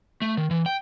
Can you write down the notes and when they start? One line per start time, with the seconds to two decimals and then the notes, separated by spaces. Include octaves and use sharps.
0.22 A3
0.37 D#3
0.51 E3
0.66 G5